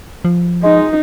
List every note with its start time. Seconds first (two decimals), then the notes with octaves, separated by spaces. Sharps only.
0.25 F3
0.63 G#3 D#4